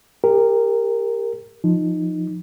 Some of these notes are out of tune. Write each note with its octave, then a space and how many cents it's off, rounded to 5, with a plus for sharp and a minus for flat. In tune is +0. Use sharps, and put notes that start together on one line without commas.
G4 +30 A#4 -10
F3 +0 D#4 +0